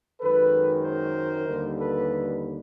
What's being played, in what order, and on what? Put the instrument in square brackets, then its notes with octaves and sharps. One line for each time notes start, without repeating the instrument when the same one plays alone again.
[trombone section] F#2 D#3 G#3 A4 B4
A#4 C5
D#2 D3 G3
A4 B4